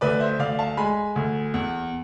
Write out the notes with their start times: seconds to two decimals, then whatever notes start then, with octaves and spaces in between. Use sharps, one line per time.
0.01 D2 B4 D5
0.20 C5 E5
0.39 D2 D5 F5
0.59 F5 A5
0.77 G#3 G#5 B5
1.16 D2
1.54 E2